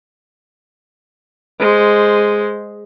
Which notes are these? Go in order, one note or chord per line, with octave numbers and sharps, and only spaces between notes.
G#3 C5